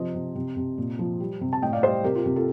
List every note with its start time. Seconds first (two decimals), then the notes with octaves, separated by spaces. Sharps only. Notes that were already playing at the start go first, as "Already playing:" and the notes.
Already playing: C3 F3 C5 D#5
0.14 C3
0.35 C3
0.57 C3
0.78 A#2
0.99 F3
1.20 G3
1.41 C3
1.53 A5
1.62 A2 D#5 G5
1.73 D5 F5
1.83 G3 C5 D#5
2.04 C3 G4 A#4
2.15 F4
2.26 C3 G4
2.36 F4 A4